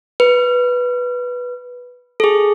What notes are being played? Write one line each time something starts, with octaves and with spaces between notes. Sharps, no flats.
B4
G#4 A4